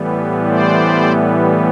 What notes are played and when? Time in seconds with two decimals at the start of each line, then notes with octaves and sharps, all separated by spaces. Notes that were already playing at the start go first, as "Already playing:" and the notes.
Already playing: A2 E3 G3 B3
0.48 C5 D5